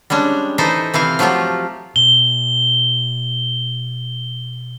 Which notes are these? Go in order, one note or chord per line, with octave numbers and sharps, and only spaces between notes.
G3 G#3 C#4 D4
E3 D#4 A4 C5 E5
C3 E3 C4 F5
F3 F#3 A3 F4 G4
B2 G7